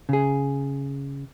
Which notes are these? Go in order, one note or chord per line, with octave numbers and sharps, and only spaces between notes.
C#3 G#4